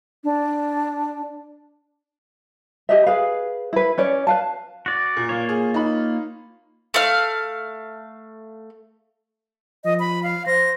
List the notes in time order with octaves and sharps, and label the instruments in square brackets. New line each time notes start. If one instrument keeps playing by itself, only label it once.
[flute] D4
[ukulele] G4 D#5 E5
G#4 B4 F5
E4 B4
C#4 C#5 D5
B4 F5 A5
[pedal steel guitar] F#4 D5
[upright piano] A#2
[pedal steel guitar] A#3 F4 C#5
[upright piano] G#4
D#4 B5
[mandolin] A3 F5
[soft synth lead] F3 [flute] D#5
[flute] B5
F5
[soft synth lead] C5 [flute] A#6